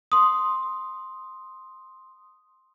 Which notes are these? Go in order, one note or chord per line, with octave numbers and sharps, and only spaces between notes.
C6 D#6